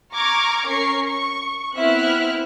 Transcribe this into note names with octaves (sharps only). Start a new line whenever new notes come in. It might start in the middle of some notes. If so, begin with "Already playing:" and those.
A#5 C#6 D6 F6 G#6 A#6
C#4 A#4 C#6 C7
C#6
B3 C4 E4 E5 F6 F#6